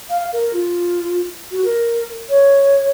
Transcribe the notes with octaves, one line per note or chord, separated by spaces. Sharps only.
F5
A#4
F4
F#4
A#4
C#5